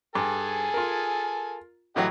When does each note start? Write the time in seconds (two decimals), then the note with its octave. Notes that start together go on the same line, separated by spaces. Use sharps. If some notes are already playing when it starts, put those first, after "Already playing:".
0.15 G2 G#4 A4 G#5
0.74 F4 A#4
1.96 A2 E3 F#3 G4 D#5 F#5